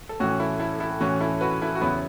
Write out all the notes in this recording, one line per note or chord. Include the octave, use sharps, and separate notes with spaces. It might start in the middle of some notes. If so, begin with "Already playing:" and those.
A4
A2 E3 C#4 F#4
E4 A4
E4 A4
E4 A4
A2 E3 C#4 F#4
E4 A4
F#4 B4
E4 A4
F#4
E2 C#3 F#3 B3 E4